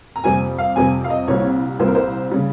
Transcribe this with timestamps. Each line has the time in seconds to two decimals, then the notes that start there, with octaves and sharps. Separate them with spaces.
0.16 A#5
0.23 F2 C3 G3 C4 F4 G#5
0.58 F5
0.76 F2 C3 G3 C4 F4 G#5
1.04 F5
1.10 D#5
1.28 C2 A#2 G3 C4 F4 C#5
1.79 C2 A#2 G3 C4 F4 C5
1.87 A#4
1.95 C5
2.31 C#3 G3